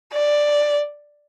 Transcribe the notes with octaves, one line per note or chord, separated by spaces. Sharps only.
D5